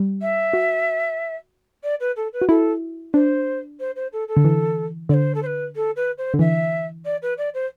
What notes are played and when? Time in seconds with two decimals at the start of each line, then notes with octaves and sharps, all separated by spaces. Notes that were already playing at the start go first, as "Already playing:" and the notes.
Already playing: G3
0.21 E5
0.53 F#4
1.83 D5
2.00 B4
2.16 A4
2.33 B4
2.42 F#4
2.49 E4 A4
3.14 D4 C5
3.79 C5
3.95 C5
4.12 A4
4.28 A4
4.37 D3
4.45 E3
5.09 D3 D5
5.13 C5
5.34 A4
5.42 C5
5.46 B4
5.75 A4
5.96 B4
6.18 C5
6.34 D3
6.39 E3 E5
7.05 D5
7.22 B4
7.38 D5
7.54 C5